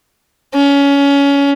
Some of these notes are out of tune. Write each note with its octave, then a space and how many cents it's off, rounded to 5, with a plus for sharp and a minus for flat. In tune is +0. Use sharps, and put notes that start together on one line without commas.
C#4 +20